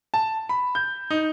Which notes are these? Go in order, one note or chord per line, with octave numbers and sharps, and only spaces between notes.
A5
B5
G6
D#4